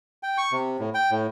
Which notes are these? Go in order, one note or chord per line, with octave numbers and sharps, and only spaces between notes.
G5
C#6
C3
A2
G5
A2